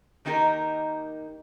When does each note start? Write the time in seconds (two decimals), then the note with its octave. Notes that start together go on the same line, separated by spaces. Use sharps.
0.25 D#3 A#3 D#4 G4 A4 A#4